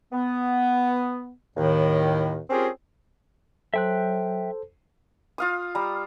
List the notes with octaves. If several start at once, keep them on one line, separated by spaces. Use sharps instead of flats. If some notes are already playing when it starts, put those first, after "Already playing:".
B3
D#2 A2 D#3
C4 C#4 F4 G4 G#4 A#4
F#3 A4 C5 E5 G5 F#6
F4 F5 D#6
G3 A#5 B5